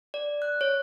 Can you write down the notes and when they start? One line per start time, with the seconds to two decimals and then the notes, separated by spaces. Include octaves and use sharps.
0.14 D5
0.42 F#6
0.61 C#5